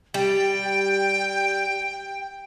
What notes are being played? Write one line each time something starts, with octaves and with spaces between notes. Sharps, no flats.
G3 G5